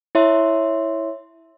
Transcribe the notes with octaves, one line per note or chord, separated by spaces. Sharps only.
E4 C#5 E5 C6